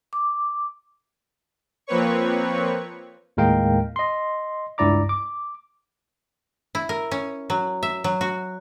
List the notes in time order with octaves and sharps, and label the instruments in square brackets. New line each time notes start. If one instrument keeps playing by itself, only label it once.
[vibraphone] D6
[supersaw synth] F3 A#3 C4 B4 C#5 C#6
[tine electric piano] D#2 A2 G#3 A#4 F5 G5
D#5 C6
C#2 G2 E4 D5 A#5 D6
D6
[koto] E4
A#4
C#4
F#3
E5
F#3
F#4